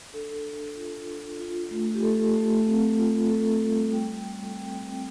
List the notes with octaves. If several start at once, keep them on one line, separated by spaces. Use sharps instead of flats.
D4 A4
D4
F4
D4
F4
A3
G4
A3 A4
A3
C4
F4
F4 A4
G3
G3 G5
G3
C4 G5
C4